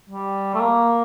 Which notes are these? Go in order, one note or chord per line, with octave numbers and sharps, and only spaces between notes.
G3
A3
A#3